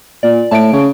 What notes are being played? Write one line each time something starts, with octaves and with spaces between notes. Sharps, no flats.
A#2 D5
A2 A5 D7
C#3